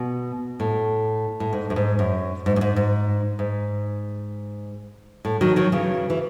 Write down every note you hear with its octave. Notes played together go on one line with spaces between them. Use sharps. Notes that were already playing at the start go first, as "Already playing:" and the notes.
Already playing: B2
A2
A2
G#2
F#2
G#2
F#2
G#2
F#2
G#2
G#2
G#2
A2
D#3 F#3
D#3 F#3
C#3 E3
E3